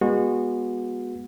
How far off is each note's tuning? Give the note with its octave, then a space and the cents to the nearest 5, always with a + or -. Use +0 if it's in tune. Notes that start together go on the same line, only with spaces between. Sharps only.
G#3 -30 B3 -30 F#4 -25